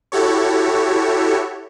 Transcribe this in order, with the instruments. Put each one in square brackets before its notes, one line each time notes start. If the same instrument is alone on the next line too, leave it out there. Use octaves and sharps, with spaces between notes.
[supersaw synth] E4 F#4 G4 A4 C#5